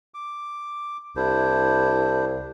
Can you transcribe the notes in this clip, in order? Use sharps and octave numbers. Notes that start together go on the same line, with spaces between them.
D6
C2 D4 E4 C5